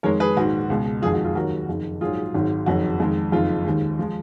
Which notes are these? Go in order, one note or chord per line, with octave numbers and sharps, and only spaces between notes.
F2 D#3 G#3 A#4 C#5
G#4 B4
A#1 G#2 D#3 F#4
C#2 B2 G#3
F#1 F2 D#3 G#3 F4 G#4
F#4
F4 G#4
D#2 D#3 F#3 F#4 A#4
F#1 F2 D#3
A#1 G#2 F#3 F4 G#4
G#1 G#2 D#3 F#3
F#1 F2 D#3 F#3 F#4
F2 D#3 G#3
F#1 F2 D#3 F4
D#2 D#3 G#3
F3 G#3 F4